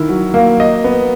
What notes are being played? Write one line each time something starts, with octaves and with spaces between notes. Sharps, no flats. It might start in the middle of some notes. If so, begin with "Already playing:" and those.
Already playing: D#3 E4
F#3
A#3
D#5
B3